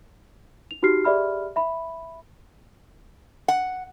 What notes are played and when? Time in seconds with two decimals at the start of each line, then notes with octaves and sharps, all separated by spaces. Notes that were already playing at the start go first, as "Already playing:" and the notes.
0.71 F7
0.82 D#4 F#4 G4 F6 C7
1.04 G4 G#4 D5 E5 B5 F6
1.56 E5 B5
3.48 F#5